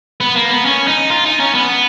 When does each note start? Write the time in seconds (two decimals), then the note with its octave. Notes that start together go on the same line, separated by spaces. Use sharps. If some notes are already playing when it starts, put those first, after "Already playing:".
0.20 B3
0.36 A#3
0.51 B3
0.65 C#4
0.88 D#4
1.10 F4
1.25 D#4
1.40 C#4
1.55 B3